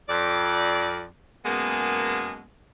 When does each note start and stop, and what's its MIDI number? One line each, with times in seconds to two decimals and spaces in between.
0.09 1.06 41
0.09 1.06 74
1.46 2.44 42
1.46 2.44 47
1.46 2.44 56
1.46 2.44 58
1.46 2.44 59
1.46 2.44 68